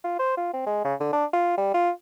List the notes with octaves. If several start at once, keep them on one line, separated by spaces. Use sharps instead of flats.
F4
C5
F4
C4
G#3
C#3
D3
D4
F4
G3
F4